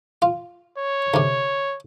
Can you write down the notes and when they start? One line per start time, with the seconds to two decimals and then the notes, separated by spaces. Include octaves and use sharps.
0.22 F4
0.78 C#5
1.14 D2 C3